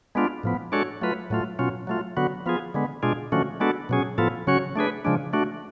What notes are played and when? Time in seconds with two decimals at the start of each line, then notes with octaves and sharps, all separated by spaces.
0.15 G#3 B3 D4 F4
0.43 A2 F3 B3
0.72 G#3 D4 F#4 A4 C#5
1.01 F#3 A3 F4 B4
1.30 A2 F#3 A3 F4
1.59 B2 F#3 C#4 F4
1.87 F#3 A3 F4
2.17 D3 F#3 B3 F#4
2.46 F3 B3 F4 G#4
2.74 D3 G#3 B3
3.03 B2 G#3 D4 F4 G#4
3.32 D3 F3 A3 C#4 F#4
3.60 G#3 B3 D4 F#4 A4
3.89 B2 F#3 C#4 G#4
4.18 A2 F3 B3 F4 A4
4.47 C#3 F#3 C#4 F#4 C#5
4.76 A3 D4 G#4 B4
5.05 C#3 F3 G#3 D4
5.33 A3 D4 F#4